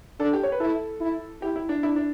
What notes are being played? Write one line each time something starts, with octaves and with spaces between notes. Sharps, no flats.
D4 A4
G4
C#5
B4
E4 A4
E4
E4 G4
E4
D4
D4 E4
D4